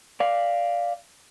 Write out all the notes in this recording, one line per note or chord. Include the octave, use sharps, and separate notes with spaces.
D5 F5